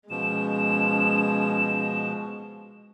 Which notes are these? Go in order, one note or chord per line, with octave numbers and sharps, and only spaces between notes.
B2 F3 G#3 C#4 E7